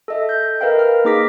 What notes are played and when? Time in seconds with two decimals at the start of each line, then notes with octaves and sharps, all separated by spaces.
0.08 A4 D#5 E5
0.29 G6
0.61 A#4 B4 D#5 F5 G5
0.79 F6
1.04 A#3 D#4 G#4 D6 A#6 B6